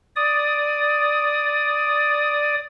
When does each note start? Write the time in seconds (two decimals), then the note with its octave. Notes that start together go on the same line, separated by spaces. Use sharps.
0.16 D5 D#6